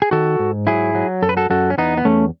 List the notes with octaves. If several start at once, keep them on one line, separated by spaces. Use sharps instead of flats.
G#4
D#3 F#4 A4
G#2
F#3 E4 G#4
F#3
F#2 A4
B4
F#4 A4
F#2 F#4 A4
C#4
E2 B3 D#4
B3
E2 A3 C#4